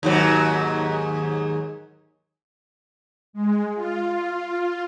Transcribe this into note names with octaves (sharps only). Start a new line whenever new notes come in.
D#2 G#2 F#3
G#3
F4